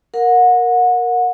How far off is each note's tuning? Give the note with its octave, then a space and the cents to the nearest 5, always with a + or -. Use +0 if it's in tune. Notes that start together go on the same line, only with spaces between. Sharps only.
A#4 +0 F#5 -30